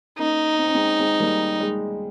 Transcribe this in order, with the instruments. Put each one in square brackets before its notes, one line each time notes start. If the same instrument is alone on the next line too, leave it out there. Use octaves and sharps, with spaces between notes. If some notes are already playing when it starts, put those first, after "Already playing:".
[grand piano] A#3 C#4 [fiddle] D#4
[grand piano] C4
C#4
G#3 C4
G#3 C4
G3 A#3
G#3